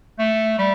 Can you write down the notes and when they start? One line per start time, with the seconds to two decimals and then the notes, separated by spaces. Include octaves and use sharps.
0.19 A3
0.58 G3